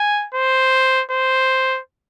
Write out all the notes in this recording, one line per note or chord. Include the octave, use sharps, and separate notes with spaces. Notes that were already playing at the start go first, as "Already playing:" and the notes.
Already playing: G#5
C5
C5